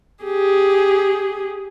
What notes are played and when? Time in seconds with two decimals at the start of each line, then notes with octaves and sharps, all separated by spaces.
0.24 G4 G#4